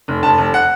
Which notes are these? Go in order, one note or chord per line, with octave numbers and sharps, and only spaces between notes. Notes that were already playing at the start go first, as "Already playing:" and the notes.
F1
F1 A5
F1
F#5